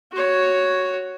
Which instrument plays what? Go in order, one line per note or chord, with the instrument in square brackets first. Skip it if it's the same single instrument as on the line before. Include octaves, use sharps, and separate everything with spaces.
[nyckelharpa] F#4 C#5